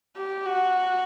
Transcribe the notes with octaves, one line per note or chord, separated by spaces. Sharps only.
G4
F#4